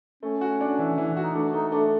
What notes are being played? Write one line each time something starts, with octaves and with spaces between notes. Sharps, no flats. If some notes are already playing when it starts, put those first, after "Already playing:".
A3 C#4
F#4
D4
E3
E3
F#4
D#4
A3 D4
A3 D#4
A3 D4